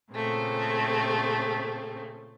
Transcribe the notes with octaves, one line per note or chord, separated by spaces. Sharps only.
A#2 C#3 A3 C4